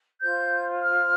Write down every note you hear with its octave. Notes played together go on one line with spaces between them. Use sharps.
F4 C5 G6
F6